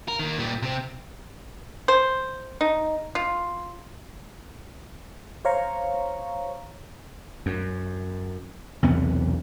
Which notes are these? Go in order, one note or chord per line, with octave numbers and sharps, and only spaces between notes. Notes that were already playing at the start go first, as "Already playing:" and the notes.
A#4
D#3 A#3
A#2 G3
C3 C4
C5
D#4
F4
C5 C#5 F5 A#5 C#6
F#2
B1 E2 C3 B3